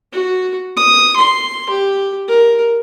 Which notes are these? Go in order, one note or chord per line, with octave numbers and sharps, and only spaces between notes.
F#4
D#6
C6
G4
A#4